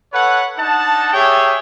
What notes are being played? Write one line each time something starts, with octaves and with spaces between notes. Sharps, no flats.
A4 B4 C#5 F#5
D4 D#4 F#5 A5
G4 G#4 C#5 E5 G5